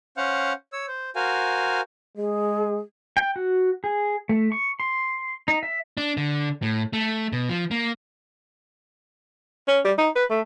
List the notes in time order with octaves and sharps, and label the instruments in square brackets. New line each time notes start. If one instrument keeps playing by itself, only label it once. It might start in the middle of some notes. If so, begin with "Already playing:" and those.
[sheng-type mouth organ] C#4 C5 F5 F#5
C#5 E6
C5
F#4 A#4 C5 F5 G#5
[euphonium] G#3 [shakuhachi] G#4
[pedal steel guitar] G5
F#4
G#4
A3
C#6
C6
D#4
E5
[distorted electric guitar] D4
D3
A2
A3
B2
F3
A#3
[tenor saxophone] C#4
G3
D#4
B4
A3